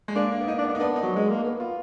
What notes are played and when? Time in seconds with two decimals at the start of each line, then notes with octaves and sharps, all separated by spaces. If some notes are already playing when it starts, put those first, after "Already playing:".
0.08 G#3
0.16 A#3 D4
0.32 A#3
0.41 B3
0.48 A#3 D#4
0.58 D4
0.63 B3
0.69 D4
0.75 D#4
0.80 B3 D4
0.96 D#4
1.03 F#3
1.16 G#3
1.30 A#3
1.44 B3
1.60 F4